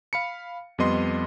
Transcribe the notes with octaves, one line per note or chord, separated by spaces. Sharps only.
F5 B5 C#7
F2 G3 B3 D#5 C6